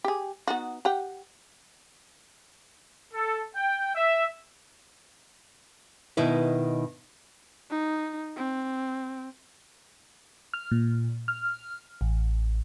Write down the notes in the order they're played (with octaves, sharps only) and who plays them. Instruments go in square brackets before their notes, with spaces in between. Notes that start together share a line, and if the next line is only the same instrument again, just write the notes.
[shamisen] G4 G#4
B3 D#4 F#4
G4 F#5 G5
[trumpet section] A4
G5
E5
[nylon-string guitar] B2 D#3 E4 B4
[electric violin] D#4
C4
[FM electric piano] F6
A#2
F6
A1